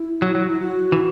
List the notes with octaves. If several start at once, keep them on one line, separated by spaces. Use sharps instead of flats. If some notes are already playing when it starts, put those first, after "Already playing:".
Already playing: E4
F#3
F#3
E4
F#4
E3